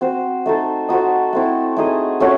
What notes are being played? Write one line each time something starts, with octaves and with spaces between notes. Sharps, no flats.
C4 F#4 C5
A3 D#4 A4
D#4 F#4 A4 C5
A3 C4 E4
A3 D#4 G#4 D#5
A3 C#4 F#4 C#5